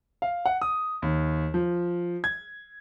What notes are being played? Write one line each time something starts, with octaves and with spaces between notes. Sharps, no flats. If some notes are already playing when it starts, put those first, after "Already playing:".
F5
F#5
D#6
D#2
F3
G#6